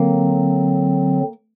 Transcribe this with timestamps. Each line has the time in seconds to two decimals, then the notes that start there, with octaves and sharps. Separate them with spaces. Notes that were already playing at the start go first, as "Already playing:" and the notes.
Already playing: D3 F#3 A#3 C4